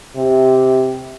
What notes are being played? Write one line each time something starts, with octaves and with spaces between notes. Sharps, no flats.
C3